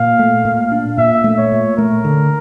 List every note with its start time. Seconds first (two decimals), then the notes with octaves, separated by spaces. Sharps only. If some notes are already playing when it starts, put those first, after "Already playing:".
Already playing: A#2 F5
0.19 A3
0.45 A#2
0.72 D4
0.98 A#2 E5
1.24 A3
1.38 C#5
1.52 A#2
1.78 A3 A#4
2.04 D3